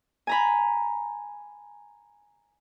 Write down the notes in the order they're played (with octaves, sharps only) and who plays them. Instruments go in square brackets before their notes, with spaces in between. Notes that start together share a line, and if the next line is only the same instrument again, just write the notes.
[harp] G#5 A#5 B5